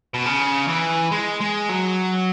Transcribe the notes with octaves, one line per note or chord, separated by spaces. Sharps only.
B2
C#3
E3
G#3
G#3
F#3